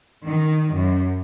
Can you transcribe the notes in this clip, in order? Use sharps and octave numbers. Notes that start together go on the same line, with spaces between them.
D#3
F#2